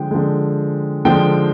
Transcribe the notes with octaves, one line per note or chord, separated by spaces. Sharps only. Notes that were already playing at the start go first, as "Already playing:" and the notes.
Already playing: D3 F3 G#3 G5
D3 F3 G#3
D3 F3 G#3 G5